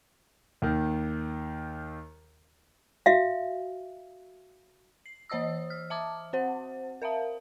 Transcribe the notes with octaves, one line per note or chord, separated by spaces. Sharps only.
D#2 D#3
F#4 E5 F5
C7
E3 C5 D#5 D#6 E6
F6
E5 A5 D6 D#6
C4 C5 F#5
A#4 E5 F5 A5